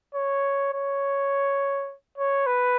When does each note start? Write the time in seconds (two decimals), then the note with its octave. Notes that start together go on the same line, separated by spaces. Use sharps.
0.15 C#5
0.73 C#5
2.18 C#5
2.46 B4